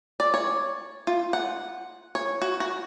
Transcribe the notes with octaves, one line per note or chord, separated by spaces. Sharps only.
D5
C#5
F4
F#5
C#5
F#4
F#4